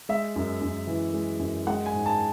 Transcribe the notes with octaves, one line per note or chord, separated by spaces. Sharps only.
G#3 E5
F#2
F#2
E3
G#3
F#2
G#3 F#5
G#5
G#2
A5